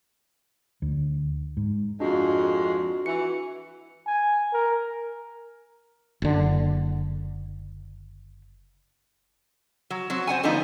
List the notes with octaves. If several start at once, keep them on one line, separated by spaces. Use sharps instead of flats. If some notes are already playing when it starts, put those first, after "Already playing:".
D2
G#2
F2 G#3 D4 F#4
E3 F#4 C#7
G#5
A#4
F#1 D3
F#3
F#3 C4 F#4
C5 C#5 F#5 G#5
D3 F3 A3 B3 D#4